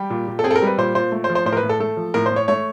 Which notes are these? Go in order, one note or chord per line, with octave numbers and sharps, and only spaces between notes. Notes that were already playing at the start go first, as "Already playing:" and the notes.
Already playing: G3 G4
A#2
A#2
A4
C4 G#4
A4
A#4
G3 B4
A#2 C5
A#2 C5
A3
C5
F3
C5
A2 C5
A#4
B4
A2
A4
A3 A4
F3
A2 A#4
C5
A2
C#5
A3 C#5